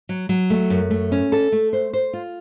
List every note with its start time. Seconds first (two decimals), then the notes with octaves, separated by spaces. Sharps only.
0.09 F#3
0.29 F#3
0.50 A3
0.70 F#2
0.90 A3
1.12 C#4
1.32 A4
1.52 A3
1.73 C5
1.93 C5
2.13 F4